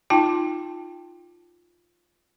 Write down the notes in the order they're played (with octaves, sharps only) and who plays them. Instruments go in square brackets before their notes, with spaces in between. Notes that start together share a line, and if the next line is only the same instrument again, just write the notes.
[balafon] D#4 F4 G5 A5